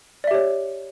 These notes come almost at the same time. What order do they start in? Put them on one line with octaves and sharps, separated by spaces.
D5 E5 G4 C#5